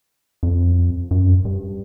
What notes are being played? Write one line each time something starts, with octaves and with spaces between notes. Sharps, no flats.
F2
F#2
G2